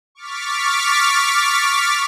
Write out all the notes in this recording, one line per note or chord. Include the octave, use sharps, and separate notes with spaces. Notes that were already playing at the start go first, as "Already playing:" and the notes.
C#6 D6 F6 A6 B6